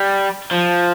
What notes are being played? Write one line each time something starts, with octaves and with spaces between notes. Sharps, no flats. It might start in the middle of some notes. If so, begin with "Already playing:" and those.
Already playing: G3
F3